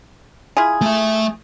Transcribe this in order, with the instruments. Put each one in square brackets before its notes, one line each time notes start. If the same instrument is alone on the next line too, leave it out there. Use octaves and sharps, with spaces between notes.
[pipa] E4 F4 G#4
[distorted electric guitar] A3 E5